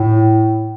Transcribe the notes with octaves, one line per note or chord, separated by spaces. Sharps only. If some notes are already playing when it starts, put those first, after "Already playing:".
Already playing: A2